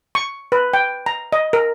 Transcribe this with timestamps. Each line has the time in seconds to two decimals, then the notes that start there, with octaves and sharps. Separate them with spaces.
0.15 C#6
0.52 B4
0.73 G5
1.06 A#5
1.33 D#5
1.53 A#4